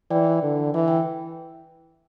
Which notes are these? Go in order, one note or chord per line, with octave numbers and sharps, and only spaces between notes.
E3 D5 G5
D3
E3 E5
G5